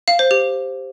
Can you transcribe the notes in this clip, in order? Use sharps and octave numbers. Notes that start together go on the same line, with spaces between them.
F5
C5
G4